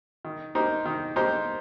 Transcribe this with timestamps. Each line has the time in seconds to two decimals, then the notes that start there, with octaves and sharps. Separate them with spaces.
0.25 D#3
0.55 A#3 D#4 G4 C5
0.86 D#3
1.16 A#3 D#4 G4 C5